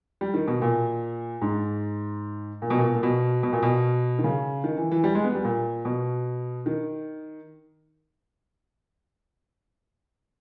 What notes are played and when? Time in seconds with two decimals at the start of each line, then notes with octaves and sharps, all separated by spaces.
0.21 G3
0.34 D#3
0.48 B2
0.62 A#2
1.41 G#2
2.62 A#2
2.70 B2
2.78 A#2
2.95 A#2
3.03 B2
3.43 B2
3.53 A#2
3.63 B2
4.19 D#3
4.24 C#3
4.64 D#3
4.77 E3
4.91 E3
5.04 G3
5.15 G#3
5.24 B3
5.35 G3
5.45 A#2
5.85 B2
6.66 D#3